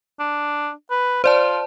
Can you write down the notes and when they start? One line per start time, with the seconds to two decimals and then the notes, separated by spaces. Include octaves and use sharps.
0.19 D4
0.91 B4
1.24 F4 C5 D5 A5